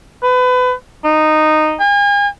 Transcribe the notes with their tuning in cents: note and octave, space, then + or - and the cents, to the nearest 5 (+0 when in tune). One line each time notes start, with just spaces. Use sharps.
B4 +30
D#4 -10
G#5 -40